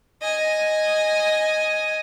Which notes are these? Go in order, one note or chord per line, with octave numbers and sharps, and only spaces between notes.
D#5 G#5